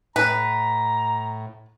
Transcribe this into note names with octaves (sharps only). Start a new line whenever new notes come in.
A2 B4 A#5